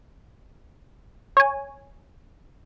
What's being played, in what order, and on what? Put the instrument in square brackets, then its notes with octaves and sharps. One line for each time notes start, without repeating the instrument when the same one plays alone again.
[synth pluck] C#5 G#5